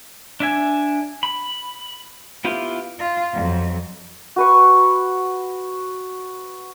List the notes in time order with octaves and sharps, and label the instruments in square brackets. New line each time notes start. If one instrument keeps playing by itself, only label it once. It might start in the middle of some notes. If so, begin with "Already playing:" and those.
[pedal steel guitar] D4 E5 G#5
B5
B3 E4 F4 G4
[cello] F4
F2 F#3
[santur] F#4 B4 C#6